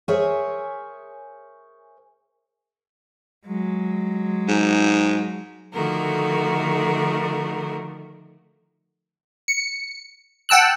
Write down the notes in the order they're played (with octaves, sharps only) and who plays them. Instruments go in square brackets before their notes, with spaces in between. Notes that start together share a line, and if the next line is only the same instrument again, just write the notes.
[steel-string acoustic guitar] G#4 A#4 C5 C#5 E5 G#5
[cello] F#3 G#3
[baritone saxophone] G#2
[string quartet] D3 D#3 F3 A3 F#4 A#4
[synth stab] C#7
F#5 G5 A5 E6 F#6